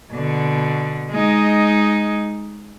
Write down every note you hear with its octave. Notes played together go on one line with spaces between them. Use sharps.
B2 D3
G#3 D#4